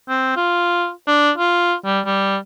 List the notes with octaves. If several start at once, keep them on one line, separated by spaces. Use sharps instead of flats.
C4
F4
D4
F4
G3
G3